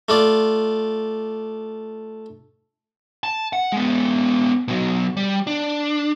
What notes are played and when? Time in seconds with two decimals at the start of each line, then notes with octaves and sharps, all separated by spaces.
0.09 A3 F4 D5
3.23 A5
3.53 F#5
3.72 G#3 B3
4.68 B2 F#3
5.17 G3
5.47 D4